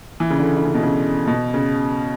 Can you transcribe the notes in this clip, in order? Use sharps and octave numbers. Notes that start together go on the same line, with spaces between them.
E3
C#3
D3
D3
C#3
B2
C#3
B2
C#3